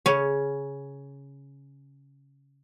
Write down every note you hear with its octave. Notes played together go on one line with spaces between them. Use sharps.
C#3 C#4